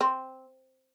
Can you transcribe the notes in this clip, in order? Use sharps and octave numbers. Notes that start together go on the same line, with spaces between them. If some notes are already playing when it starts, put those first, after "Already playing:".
C4